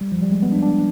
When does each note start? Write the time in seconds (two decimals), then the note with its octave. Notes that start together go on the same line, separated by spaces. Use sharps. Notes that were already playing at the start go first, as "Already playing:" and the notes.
0.01 G3
0.12 F3
0.22 G3
0.32 G#3
0.42 B3
0.52 D4
0.63 D4